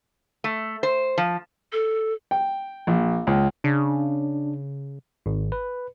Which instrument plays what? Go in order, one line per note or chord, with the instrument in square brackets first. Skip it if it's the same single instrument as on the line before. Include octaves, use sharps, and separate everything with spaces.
[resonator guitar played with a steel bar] A3
C5
F3
[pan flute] A4
[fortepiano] G5
A#1
C#2
[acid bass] C#3 [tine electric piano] D4
[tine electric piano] G#1
B4